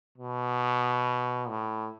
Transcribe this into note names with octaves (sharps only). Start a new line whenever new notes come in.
B2
A2